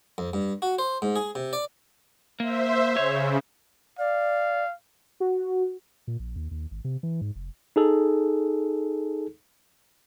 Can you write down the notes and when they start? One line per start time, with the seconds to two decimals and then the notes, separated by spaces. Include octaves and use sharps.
0.18 F2
0.33 G2
0.62 F#4
0.79 C5
1.02 G#2
1.16 G#4
1.35 C3
1.53 D5
2.40 A#3 C5 E5
2.97 C#3 C#5
3.99 D5 F5
5.20 F#4
6.08 A#2
6.20 A#1
6.36 D#2
6.51 D#2
6.71 G#1
6.84 C3
7.03 E3
7.21 G#2
7.36 F1
7.76 D#4 G#4 A4